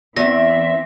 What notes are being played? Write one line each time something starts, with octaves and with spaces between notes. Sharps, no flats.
E2 E3 C4 E5 A#6